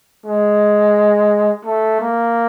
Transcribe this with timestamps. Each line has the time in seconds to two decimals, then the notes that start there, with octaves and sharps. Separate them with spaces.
0.26 G#3
1.65 A3
2.01 A#3